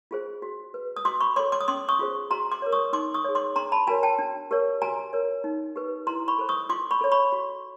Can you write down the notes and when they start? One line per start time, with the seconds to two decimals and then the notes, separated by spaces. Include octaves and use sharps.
0.11 F4 G#4 C5
0.42 F#4
0.74 B4
0.97 D#6
1.05 F#4 C6 D6
1.21 B5 C#6
1.36 C#5 C6 D6
1.39 A4
1.52 C6 D6
1.61 D#6
1.68 C#4 C6 D6
1.89 C#6 D#6
1.99 F4 G#4 C5
2.31 F#4 A#5 C6
2.52 C6 D6
2.62 A#4 C#5
2.72 C#6 D#6
2.93 D#4 C6 D6
3.14 C#6 D#6
3.24 G#4 C#5
3.35 C6 D6
3.56 D4 A#5 C6
3.72 A5 B5
3.87 F#4 A#4 C#5 G#5 A#5
4.03 G5 A5
4.19 D4
4.51 G4 A#4 C#5
4.82 F#4 G#5 A#5
5.13 A#4 C#5
5.44 D#4
5.76 G4 B4
6.07 E4 A#5 C6
6.28 B5 C#6
6.38 A4 C5
6.49 C#6 D#6
6.69 F4 C6 D6
6.91 B5 C#6
7.01 A4 C#5
7.12 B5 C#6
7.32 F#4